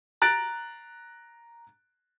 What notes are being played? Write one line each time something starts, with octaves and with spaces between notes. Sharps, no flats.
A#5 F#6 A6 D7